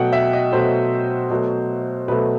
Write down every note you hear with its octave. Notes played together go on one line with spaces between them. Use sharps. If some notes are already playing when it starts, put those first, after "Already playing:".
Already playing: B2 F#3 A3 F#5 G5
E5
D#5
B2 F#3 A3 C5
B2 F#3 A3
B2 F#3 A3 B4